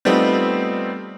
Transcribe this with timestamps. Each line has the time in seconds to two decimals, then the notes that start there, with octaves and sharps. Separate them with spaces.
0.05 G3 A3 B3 C4 D#4 F4